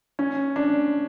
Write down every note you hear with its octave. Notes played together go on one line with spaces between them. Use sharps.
C#4
D4